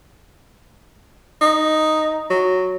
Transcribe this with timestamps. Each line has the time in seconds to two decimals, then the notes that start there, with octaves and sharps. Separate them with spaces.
1.41 D#4
2.30 F#3